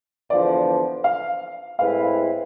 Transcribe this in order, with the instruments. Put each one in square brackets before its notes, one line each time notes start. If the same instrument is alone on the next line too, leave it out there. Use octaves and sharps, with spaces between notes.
[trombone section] E2 D3 F3 B3 [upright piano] D5
[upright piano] F5
[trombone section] A2 G#3 C4 E4 B4 [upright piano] F5